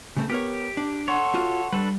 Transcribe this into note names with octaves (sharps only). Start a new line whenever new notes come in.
C#3 A3 C4
B3 G4 A#4 C#5
D4
A4 C#5 F#5 C6 C#6
F4 F#4
G3 D4 A4 B4